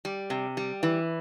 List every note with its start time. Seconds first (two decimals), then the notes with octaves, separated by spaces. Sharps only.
0.05 G3
0.30 C3
0.57 G3
0.83 E3